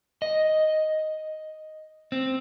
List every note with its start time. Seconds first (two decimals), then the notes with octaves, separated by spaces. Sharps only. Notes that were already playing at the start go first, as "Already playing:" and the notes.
0.22 D#5
2.12 C4